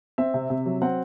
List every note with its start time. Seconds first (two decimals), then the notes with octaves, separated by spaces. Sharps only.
0.18 C4 E5
0.34 C3
0.50 C3
0.66 F#3
0.82 C4 F#5